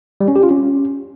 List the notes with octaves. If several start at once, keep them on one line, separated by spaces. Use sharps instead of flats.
G3
C#4
G4
F4
C#4